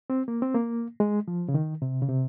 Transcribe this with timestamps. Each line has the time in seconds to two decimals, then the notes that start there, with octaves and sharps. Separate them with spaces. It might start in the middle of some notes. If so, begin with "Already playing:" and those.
0.10 C4
0.28 A#3
0.42 C4
0.54 A#3
1.00 G#3
1.28 F3
1.48 C#3
1.54 D#3
1.82 C3
2.02 C#3
2.08 C3